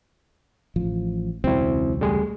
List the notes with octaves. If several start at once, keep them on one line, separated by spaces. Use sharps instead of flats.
A1 F3
E1 C#2 F#3 C4 E4
G3 A3 G#4